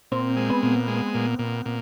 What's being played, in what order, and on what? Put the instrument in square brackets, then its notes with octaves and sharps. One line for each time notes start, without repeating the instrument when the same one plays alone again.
[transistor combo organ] A#2 [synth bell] C4
[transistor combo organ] G#3
[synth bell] B3
[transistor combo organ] A#2
G#3
A#2
A#2
A#2